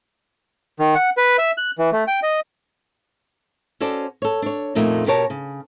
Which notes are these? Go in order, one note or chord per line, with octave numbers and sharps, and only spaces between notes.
D#3
F#5
B4
E5
F#6
E3
A3
G5
D#5
C#4 F#4 A4 C5 D5
A4 C#5
D4 C#5
F2 A#2 A3 A#3 D#4
B2 G4 A#4 C#5 A5
C#3